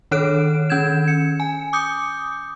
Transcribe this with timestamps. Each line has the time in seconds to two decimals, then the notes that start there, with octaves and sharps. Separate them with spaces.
0.11 D#3 D4 A4 C#5 F#6 D7
0.70 D#3 C#4 G6 G#6 E7
1.08 C#7
1.40 G#5
1.73 D6 D#6 G6 C#7